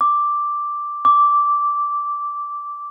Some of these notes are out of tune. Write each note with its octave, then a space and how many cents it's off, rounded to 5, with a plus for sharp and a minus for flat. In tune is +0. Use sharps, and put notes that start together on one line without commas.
D6 +0
D6 -10